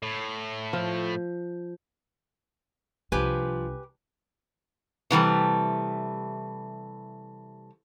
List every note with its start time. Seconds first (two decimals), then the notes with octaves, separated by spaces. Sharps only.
0.03 A2
0.73 F3
3.12 C2 F3 D4 G4 B4 G#5
5.11 C3 E3 G3 A3